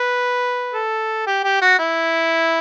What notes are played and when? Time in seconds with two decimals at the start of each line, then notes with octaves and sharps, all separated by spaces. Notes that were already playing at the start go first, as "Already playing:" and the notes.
Already playing: B4
0.74 A4
1.27 G4
1.44 G4
1.62 F#4
1.79 E4